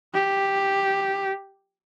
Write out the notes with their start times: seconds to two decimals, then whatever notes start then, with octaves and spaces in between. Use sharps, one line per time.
0.14 G4